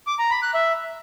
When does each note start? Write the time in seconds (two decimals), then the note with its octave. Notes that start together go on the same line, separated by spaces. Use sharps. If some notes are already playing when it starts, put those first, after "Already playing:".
0.07 D6
0.19 A#5
0.31 B5
0.42 F#6
0.54 E5